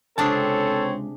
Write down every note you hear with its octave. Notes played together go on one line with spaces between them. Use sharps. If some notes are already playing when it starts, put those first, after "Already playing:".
C#2 C3 C4 D4 G#4 A4 C#5 A5